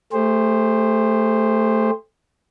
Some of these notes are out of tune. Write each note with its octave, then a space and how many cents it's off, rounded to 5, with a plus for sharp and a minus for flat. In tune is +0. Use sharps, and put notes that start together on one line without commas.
A3 +0 G4 +45 C5 +0